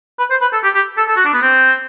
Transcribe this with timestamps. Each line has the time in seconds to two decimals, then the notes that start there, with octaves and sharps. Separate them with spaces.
0.19 B4
0.30 C5
0.41 B4
0.53 A4
0.63 G4
0.75 G4
0.97 A4
1.08 A4
1.16 F#4
1.25 D4
1.33 B3
1.42 C4